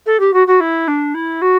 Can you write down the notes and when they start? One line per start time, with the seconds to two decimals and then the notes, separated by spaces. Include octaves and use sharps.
0.06 A4
0.19 G4
0.33 F#4
0.47 F#4
0.60 E4
0.87 D4
1.14 E4
1.41 F#4